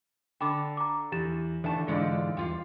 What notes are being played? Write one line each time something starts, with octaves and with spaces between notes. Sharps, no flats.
D3 G5 A5 B5 D6
A#5 D6
E2 E3 G4 A6 E7
D#2 E3 A3 D4 A5
G#2 D3 E3 G#3 D#4 F4 D5 C#7
E2 G3 F4 F5